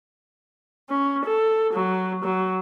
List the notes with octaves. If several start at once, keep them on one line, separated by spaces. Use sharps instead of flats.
C#4
A4
F#3
F#3